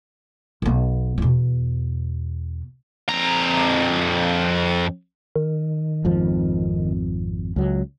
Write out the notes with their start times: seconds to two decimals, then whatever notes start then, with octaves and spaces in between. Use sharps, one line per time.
0.62 B1 B3
1.18 E2 B2
3.09 F2 A#5
5.36 D#3
6.05 G#1 F2 F3
7.56 C#2 F#3